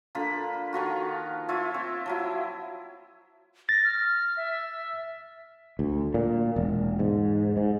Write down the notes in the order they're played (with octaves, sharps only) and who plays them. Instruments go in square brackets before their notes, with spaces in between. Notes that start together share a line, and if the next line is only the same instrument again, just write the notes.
[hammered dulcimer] D3 A#3 F4 B5
D#3 F3 F4 F#4
E4 F4 C#5 E5
C4
F3 F#3 E4
[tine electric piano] A6 [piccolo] A#6
[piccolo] F6
E5
[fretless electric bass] D2
A#2
E1
G#2
G#2